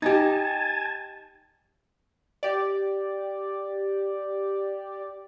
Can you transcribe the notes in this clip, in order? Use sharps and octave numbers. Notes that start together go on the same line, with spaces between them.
D#4 G4 G#5 A5
G4 D5